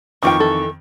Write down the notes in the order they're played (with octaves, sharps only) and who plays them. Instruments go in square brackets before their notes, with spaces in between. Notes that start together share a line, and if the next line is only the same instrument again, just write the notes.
[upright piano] F2 D#3 D6 [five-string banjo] E3 F4 G5 [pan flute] C#6
[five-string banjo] E3 A4